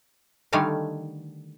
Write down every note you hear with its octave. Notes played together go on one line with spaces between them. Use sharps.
D3 D#3 G3 A3 F5 G#5